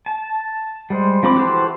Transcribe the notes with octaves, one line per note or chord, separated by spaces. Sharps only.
A5
G3 G#3 C5
F3 C4 B5 D6
E3 F#4 G4 A4 C5